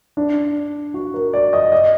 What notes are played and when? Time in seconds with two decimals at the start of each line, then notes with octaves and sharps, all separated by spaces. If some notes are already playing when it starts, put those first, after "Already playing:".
0.17 D4
0.94 F#4
1.14 A#4
1.33 D5
1.53 D#5
1.72 D#5